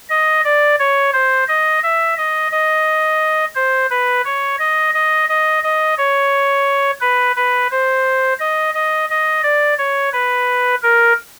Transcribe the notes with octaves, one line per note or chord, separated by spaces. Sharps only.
D#5
D5
C#5
C5
D#5
E5
D#5
D#5
C5
B4
C#5
D#5
D#5
D#5
D#5
C#5
B4
B4
C5
D#5
D#5
D#5
D5
C#5
B4
A#4